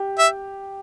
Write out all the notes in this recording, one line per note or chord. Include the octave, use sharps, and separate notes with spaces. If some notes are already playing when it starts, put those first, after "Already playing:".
Already playing: G4
E5